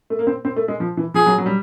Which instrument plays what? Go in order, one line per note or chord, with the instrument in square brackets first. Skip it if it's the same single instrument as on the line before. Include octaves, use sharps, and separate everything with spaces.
[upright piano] A3
A#3
C4
C4
A3
G#3
F3
E3
[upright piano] F3 [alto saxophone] G#4
[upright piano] F#3
F#3
G3